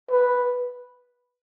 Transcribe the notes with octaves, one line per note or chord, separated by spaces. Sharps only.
B4